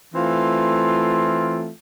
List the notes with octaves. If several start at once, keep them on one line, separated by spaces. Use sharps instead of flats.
E3 A3 C4 F4